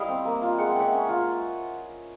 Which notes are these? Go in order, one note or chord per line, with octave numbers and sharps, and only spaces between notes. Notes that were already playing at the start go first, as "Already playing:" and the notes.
Already playing: G3 E4 D#5 F5
C4
A#3
F4
G#3 F#5
G5
C#4 E5 F#5
C#4
F4